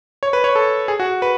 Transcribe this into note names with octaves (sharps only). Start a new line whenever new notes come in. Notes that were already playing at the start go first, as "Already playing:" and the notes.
C#5
B4
C#5
A4
G#4
F#4
B4